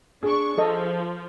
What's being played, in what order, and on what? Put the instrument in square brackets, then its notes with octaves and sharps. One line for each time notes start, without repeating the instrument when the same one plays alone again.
[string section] D4 C#6 [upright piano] G#4
[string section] F3 [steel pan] A4 D#5